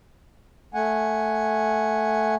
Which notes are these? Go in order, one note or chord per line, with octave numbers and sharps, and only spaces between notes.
A3 F#5 G#5